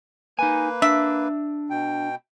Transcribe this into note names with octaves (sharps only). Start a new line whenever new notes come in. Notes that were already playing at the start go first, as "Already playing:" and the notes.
A#3 D#4 B4 G#5
D4 E5
B2 G5